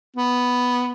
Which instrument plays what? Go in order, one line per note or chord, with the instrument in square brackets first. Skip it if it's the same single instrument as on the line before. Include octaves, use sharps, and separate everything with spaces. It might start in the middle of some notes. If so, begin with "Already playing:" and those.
[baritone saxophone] B3